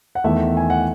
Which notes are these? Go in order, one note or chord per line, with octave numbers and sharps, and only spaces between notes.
F#5
E2 D#3 A3 E5
G#5
F#5